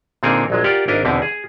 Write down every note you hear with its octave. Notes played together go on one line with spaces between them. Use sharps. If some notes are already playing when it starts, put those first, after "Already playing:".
A#2 D3 C4 D#4 G#4 A#4
A#1 F#3 G#3
F4 G4 A#4 D5 F#5
G#1 D4 E4 A#4 D#5 F5
E2 B2 D3 C4 D#4 E4
G#4